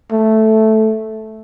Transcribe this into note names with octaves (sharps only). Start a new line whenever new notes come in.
A3